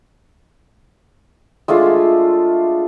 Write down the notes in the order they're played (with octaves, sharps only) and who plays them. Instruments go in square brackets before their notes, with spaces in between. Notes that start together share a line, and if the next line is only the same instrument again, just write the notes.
[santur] G#3 A3 D4 F4